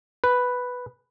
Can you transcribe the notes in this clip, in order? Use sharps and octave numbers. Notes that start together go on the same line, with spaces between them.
B4